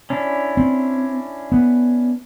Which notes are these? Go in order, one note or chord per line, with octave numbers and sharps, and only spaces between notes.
C#4 D4 E4
C4
B3